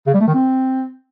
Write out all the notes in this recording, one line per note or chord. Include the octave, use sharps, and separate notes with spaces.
C#3
G3
A3
D#3
C4